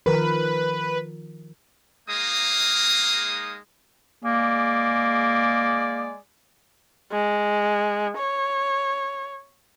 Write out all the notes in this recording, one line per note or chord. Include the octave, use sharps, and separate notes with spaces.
D#3 F3 A#4 B4
G#3 A#3 D#4 F5 D#6
G#3 A#3 G#4 D5
G#3
C#5